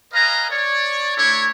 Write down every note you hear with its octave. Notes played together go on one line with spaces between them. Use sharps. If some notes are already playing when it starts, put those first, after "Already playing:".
A#4 B4 D#5 F5 G#5 A#5
C#5 D5
A3 D4 E4 A4 C#5